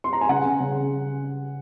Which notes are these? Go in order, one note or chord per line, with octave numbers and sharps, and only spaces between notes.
C6
A#5
G#5
C#3 F#5
C#3
C#3